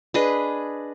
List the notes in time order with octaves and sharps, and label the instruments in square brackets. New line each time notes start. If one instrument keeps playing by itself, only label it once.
[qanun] D4 G#4 B4 D#5